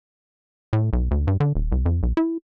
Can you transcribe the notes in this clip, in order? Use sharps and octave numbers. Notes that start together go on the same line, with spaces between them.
A2
B1
D2
G2
D3
D#1
C2
F2
B1
E4